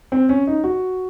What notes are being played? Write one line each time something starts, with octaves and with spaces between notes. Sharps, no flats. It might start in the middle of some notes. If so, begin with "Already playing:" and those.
C4
C#4
D#4
F#4